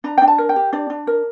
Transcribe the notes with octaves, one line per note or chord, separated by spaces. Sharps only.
D4 A#5
D4 G5
A5
A#4
G5
G4
D4 D5
D4
A#4